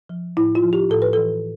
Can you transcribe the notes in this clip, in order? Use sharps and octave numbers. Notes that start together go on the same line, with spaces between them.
F3
A2 E4
F4
F3
G4
A2 A4
B4
E3 A4